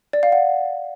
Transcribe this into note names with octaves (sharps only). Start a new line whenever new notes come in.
D5
F5
F#5